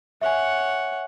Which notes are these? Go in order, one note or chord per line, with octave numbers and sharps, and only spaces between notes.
C#5 E5 F#5 G#5